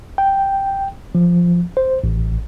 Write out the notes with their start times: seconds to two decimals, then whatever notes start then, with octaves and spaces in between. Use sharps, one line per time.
0.18 G5
1.15 F3
1.77 C5
2.04 A1